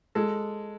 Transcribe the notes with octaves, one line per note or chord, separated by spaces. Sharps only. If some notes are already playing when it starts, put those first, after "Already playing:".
G#3 A4